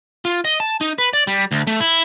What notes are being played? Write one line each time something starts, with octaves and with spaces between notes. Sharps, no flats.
F4
D#5
A5
D#4
B4
D5
G3
D2
A3
E4